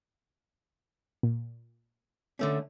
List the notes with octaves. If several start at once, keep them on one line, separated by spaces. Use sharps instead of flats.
A#2
D3 A3 C#4